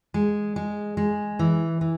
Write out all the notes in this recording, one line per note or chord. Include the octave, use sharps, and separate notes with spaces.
G#3
G#3
G#3
E3
E3